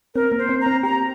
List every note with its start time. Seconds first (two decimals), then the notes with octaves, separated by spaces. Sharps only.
0.15 C4 A#4
0.32 A#3
0.38 C5
0.49 C4
0.61 A#5
0.66 C4
0.83 G4 A#5